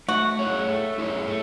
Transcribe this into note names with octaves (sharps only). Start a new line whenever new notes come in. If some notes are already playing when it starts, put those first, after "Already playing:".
A3 F#4
E4 G#4 C#5
A3
E4 G#4 C#5
A3